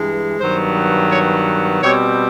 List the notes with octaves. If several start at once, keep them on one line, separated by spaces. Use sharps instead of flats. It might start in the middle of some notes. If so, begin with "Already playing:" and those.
Already playing: G2 E3 G#3
G2 D#3 F#3 B3 C5
C#5
B2 G3 C4 C#5